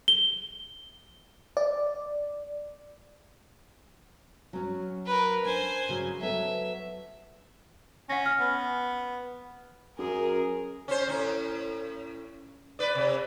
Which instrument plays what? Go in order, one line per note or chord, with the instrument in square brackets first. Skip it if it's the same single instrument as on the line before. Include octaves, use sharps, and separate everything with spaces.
[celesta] G7
[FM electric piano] D5
[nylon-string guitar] F#3 C#4
[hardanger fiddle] A#4 B4
[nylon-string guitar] D4 [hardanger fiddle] C5 G#5
[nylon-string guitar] C#3 F#3 G#4
[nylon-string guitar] F#3 B3 A4 [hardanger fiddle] E5
[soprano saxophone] C#4 [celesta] F#5 A#6
[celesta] F6
[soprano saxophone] B3
[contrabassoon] F#2 [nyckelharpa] G#4 [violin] A#4
[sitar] C#4 C5
A2 C#4
B4 D5
C3